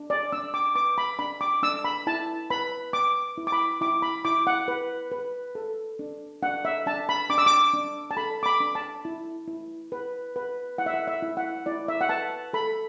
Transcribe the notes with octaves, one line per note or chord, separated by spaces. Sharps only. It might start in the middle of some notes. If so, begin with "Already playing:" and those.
Already playing: D4
D5
D4 E6
D6
B4 D6
B5
D4 B5
D6
D4 E6
B5
E4 A5
B4 B5
B4 D6
E4
D6
B5
E4 D6
B5
E4 D6
F#5
B4
B4
A4
D4
D4 F#5
E5
D4 A5
B5
D4 D6
E6
D6
D4
A5
A4 B5
D6
B5
D4
A5
E4
E4
B4
B4
E4 F#5
E5
F#5
E5
E4
F#5
E4 D5
E5
F#5
B4 A5
A4 B5